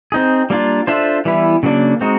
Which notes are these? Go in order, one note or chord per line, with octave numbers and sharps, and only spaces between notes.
C4 D#4 G#4
G3 A#3 D4 F4
D4 F4 A4 C5 E5
E3 G3 B3 E4
C#3 F#3 A#3 D4
G#3 C4 D#4 F#4